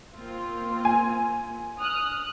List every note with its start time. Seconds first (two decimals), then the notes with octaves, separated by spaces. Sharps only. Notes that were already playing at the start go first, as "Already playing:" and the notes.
0.15 A#3 C4 F4
0.85 G#5
1.79 D#6 F6 F#6